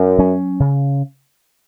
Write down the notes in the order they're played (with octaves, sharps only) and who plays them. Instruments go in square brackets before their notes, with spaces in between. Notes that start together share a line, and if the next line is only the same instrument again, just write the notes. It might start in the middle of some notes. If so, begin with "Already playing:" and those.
Already playing: [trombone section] F#2
[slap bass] F#3 C#4
C#3